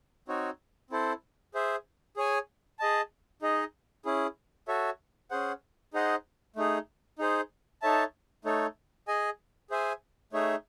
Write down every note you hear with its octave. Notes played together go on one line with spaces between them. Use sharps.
C4 D#4 F#4 C#5
C4 E4 A4 C5
G#4 C5 E5
G#4 C#5 G#5
G#4 D#5 A5
D#4 G#4 D#5
C#4 E4 G#4
F#4 A4 C#5 E5
C#4 G#4 C5 F#5
D#4 G#4 C5 D#5 F#5
A3 D#4 G#4
D#4 G#4 C5
D#4 A4 C#5 E5 A5
A3 D#4 A4 C#5
G#4 D#5 G#5
G#4 C5 E5 G#5
A3 D#4 G#4 C#5 E5